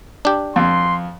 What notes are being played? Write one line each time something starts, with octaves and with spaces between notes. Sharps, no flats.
D4 G4
F2 C6